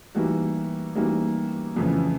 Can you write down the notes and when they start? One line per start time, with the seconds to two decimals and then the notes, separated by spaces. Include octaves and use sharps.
0.15 E3 G3 A#3 D#4 F#4
0.95 E3 G3 A#3 D#4 F#4
1.76 F2 C#3 E3